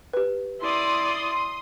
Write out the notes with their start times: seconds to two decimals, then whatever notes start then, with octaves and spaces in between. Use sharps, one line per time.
0.13 G4 B4
0.61 E4 D5 C6 D#6